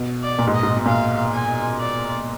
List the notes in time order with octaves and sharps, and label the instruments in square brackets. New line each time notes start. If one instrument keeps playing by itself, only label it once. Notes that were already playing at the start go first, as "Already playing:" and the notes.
Already playing: [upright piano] B2
[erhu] D5
[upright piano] A#2
G#2
[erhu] D#5
[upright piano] G#2
B2
[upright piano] A#2 [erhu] F5
[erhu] G#5
D5